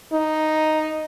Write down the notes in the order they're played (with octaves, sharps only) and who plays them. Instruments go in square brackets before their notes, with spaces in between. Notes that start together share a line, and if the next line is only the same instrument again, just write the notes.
[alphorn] D#4